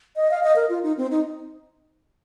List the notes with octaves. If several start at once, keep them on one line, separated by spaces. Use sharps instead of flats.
D#5
F5
D#5
A#4
F4
D#4
C4
D#4